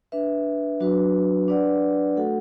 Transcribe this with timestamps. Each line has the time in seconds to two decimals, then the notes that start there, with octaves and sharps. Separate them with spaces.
0.12 D4 B4 E5
0.80 F#3 D4 F#4 B4
1.48 D4 B4 D5 F#5
2.16 A3 F#4 A4 F#5